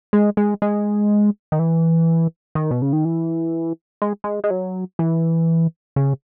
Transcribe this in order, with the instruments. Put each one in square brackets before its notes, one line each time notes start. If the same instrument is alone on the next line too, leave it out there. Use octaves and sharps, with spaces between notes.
[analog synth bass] G#3
G#3
G#3
D#3
E3
D#3
B2
C#3
D#3
E3
G#3
G#3
G#3
F#3
E3
C#3